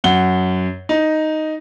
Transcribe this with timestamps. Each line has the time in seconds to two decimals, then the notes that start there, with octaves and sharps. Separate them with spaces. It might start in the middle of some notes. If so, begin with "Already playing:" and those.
0.04 F#2 F#5 G7
0.89 D#4